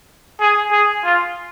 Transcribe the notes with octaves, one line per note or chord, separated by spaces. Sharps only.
G#4
G#4
F4